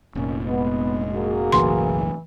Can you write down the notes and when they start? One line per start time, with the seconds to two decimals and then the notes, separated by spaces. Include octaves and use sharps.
0.15 F1 A#2 D#3 C#4
0.46 G#3 B3
1.13 A#3 F#4 G#4
1.52 F#1 B1 A2 E3 C6